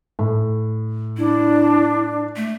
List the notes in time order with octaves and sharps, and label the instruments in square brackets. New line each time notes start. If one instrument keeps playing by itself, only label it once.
[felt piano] A2
[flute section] D4 [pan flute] E4
[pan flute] A3